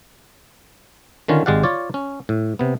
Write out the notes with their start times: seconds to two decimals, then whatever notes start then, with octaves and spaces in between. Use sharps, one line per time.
1.28 D3 D#3 C#4 F4
1.46 G#1 G#3 G4 D5 F5 F#5
1.63 F4 C#5 D5
1.94 C#4
2.29 A2
2.59 C3 B3